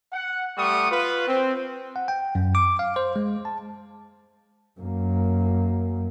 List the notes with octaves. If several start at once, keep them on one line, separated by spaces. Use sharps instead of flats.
F#5
G3 A3 F#5 C#6 D#6
F4 B4
C4
F#5
G5
F#2
D6
F5
C5
G#3
A5
F#2 A#3